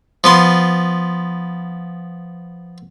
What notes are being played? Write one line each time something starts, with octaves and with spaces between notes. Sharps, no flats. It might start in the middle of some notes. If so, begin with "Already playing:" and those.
F3 B3 C6